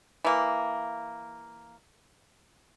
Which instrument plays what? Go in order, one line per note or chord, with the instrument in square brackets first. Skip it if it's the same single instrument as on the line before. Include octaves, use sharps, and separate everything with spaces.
[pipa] E3 A#3